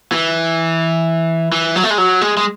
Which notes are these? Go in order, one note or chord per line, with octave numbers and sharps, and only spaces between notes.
E3
E3
F#3
A3
G#3
F#3
G#3
G#3